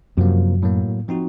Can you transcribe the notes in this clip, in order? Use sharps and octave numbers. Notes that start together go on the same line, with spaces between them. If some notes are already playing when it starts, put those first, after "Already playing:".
F#2 C3 F3 A#3
A2 F#3 A#3
F3 C4 D#4 F#4